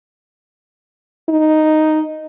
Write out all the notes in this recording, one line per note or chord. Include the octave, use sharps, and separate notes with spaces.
D#4